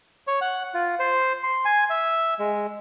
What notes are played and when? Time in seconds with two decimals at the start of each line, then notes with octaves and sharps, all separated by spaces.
0.27 C#5
0.41 F#5
0.74 F4
0.99 C5
1.43 C6
1.65 G#5
1.90 E5
2.39 G#3